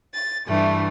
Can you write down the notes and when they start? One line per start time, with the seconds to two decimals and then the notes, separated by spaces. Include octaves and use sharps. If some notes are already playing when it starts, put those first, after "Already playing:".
0.13 A6
0.47 G2 E3 A3